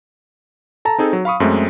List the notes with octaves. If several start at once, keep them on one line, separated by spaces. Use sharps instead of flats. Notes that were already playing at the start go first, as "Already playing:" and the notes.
A4 A5 A#5
C4 D#4 G#4 A4
F#3
F5 B5 C#6 D#6
F#2 G#3 A3 C4